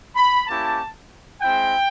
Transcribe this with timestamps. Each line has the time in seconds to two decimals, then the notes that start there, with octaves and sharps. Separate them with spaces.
0.15 B5
0.47 A#3 C#4 E4 G4 A5
1.41 G#3 C4 E4 G5